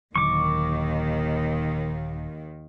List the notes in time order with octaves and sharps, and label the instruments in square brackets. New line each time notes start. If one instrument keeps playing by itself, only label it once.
[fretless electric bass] D#1 D3 F#3 [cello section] D#2 D#3 [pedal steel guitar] C#6 D6